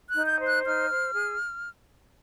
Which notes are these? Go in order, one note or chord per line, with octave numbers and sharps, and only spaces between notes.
F#6
D#4
G6
C5
F#6
D#4 F6
C5
G#4